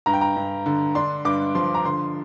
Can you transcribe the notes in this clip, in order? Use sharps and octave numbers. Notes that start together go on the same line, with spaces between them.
G2 A#5
G5
A#5
G2
D3
D4 C6
G2 D6
F3 C6
A#5
D3 C6